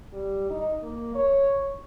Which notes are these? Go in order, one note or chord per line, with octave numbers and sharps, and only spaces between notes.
G3
D#4
A#3
C#5